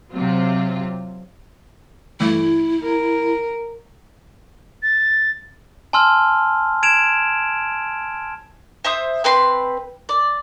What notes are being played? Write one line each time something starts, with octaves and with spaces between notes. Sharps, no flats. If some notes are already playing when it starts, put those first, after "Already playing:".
C3 F#3 C4 F4
G2 E3 A3 E4
A#4
A6
G#5 A5 C6 E6 F6
G#6 D7 E7 F7
C5 E5 D#6 E6
C4 B4 B5 C6
D5